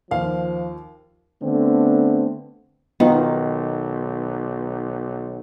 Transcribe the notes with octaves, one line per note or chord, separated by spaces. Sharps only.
D#2 F3 F5
D3 A3 B3 C4
B1 D#3 B3 D#4 F4